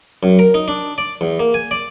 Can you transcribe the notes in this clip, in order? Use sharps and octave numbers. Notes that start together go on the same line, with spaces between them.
F#2
A#4
D#4
D4
D5
E2
A#3
G#5
D5